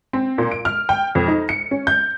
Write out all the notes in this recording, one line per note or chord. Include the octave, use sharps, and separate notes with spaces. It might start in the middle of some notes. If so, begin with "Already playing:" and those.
C4
A#2
D7
F6
G5
F2
D#4
C#7
C#4
G6